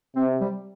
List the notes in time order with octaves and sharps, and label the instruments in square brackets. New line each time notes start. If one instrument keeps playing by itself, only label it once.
[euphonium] C3 [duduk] C4
[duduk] G3